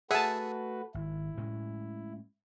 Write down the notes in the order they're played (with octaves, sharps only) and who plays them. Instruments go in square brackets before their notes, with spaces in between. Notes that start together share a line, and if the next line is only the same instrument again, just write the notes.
[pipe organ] A3 F#4 B4 [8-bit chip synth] G#4 E5 F#5 [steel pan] G#5 A5
[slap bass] G#1 [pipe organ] E4
[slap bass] A2 G#3 C#4